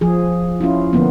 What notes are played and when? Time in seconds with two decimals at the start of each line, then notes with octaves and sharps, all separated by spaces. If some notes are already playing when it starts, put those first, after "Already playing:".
0.01 F3 G#4
0.61 C#4 E4 F4
0.93 D3 F3 A#3 B3